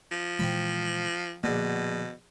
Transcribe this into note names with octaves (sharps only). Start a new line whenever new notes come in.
F3
A#2 E3 G#3 C4 B5
A#1 B2 D3 A#3